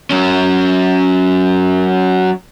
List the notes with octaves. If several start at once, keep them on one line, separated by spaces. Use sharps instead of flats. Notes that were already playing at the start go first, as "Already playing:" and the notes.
F#3 C#4